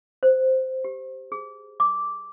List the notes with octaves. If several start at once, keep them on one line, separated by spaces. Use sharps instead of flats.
C5
G4
G#4
D6